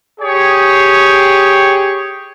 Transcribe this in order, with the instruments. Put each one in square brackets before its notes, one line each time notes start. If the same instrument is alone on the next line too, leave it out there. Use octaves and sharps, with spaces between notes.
[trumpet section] G4 G#4 C#5